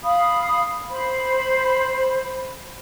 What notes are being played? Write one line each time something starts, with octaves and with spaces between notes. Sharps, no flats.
F5 B5 D#6
C5 B5